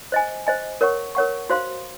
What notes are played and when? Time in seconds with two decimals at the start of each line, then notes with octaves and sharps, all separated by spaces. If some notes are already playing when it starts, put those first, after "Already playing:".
0.12 C5 D#5 G#5
0.47 C5 D#5 G#5
0.81 A#4 C#5 F#5 C#6
1.15 A#4 C#5 F#5 C#6
1.50 F#4 C5 F5 C6